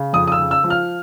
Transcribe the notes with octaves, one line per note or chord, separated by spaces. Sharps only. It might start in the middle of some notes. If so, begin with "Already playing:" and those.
Already playing: C#3
F2 D#6
D#6
E6
C#3
E6
F3
F6